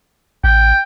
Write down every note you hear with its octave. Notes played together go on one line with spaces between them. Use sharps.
A1 G5